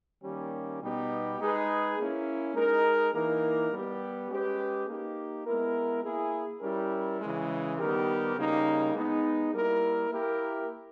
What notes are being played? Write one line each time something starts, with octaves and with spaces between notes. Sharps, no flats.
D#3 G3 A#3 C#4 G4
B2 G3 B3 D#4 G4
G#3 D#4 G#4 B4
A#3 C#4 E4
G#3 D#4 A#4
E3 A#3 D#4 A#4
G3 B3 G4
G#3 C#4 G4 B4
A#3 D#4 G4
G#3 B3 E4 A#4
A#3 E4 G#4
G3 C#4 E4 G4 A#4
C#3 E3 G#3
D#3 G3 B3 G4 A#4
C#3 G3 A#3 D#4
G#3 B3 D#4
G3 A#3 E4 A#4
A#3 E4 G4 A#4